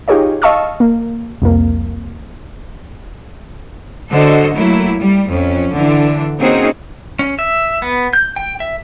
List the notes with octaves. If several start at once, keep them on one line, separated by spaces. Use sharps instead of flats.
D#4 F4 G4 G#4 C#5 D#5
D#5 F5 A5 C#6 E6 F6
A#3
C2 F2 A#3
D3 F#4 A4 C5 D#5
F#3 A3 A#3 E4
G3
F2 C#4
D3 E3 D4
A#3 C4 C#4 D#4 F#4 G#4
C#4
E5
B3
G6
G5
E5